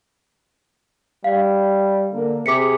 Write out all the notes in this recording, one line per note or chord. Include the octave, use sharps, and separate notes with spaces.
G3 F5
D3 A#3
C3 G#4 D6 B6 C#7